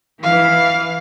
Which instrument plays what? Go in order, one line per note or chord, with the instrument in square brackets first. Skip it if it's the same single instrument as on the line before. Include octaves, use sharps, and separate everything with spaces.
[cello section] E3 [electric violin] F5